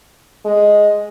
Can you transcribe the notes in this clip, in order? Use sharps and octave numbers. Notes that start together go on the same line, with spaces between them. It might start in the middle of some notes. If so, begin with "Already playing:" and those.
G#3